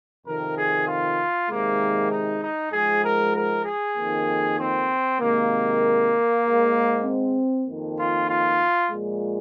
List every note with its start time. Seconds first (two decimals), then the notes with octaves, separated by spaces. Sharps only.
0.25 F2 C3 D#3 A#4
0.55 G#4
0.87 F4
1.48 C3 D#3 G#3 A#3
2.10 D#4
2.42 D#4
2.72 G#2 F3 G#3 G#4
3.03 A#4
3.34 A#4
3.64 G#4
3.95 F2 D#3 A#3
4.58 C4
5.18 C3 D#3 G#3 A#3
6.42 G#2 G#3
7.04 C4
7.66 F2 D#3 A#3
7.96 F4
8.28 F4
8.89 A#2 F3 G#3